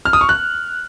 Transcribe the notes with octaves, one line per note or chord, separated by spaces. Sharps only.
F6
D#6
C#6
F#6